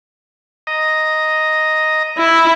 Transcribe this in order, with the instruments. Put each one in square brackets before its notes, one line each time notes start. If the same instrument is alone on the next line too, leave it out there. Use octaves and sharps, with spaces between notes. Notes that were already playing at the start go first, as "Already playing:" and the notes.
[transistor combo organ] D#5 A#5
[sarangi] E4